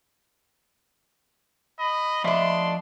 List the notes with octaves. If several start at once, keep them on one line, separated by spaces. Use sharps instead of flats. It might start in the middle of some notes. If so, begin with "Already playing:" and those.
D#5 B5
F3 A3 D4 D5 D#5 C6